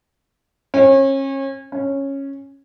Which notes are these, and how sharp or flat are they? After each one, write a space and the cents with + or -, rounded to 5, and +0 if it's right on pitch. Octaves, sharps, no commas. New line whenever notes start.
C#4 -35
C#4 -10